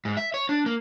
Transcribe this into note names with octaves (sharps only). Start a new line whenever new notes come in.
G#2
E5
C#5
D4
A#3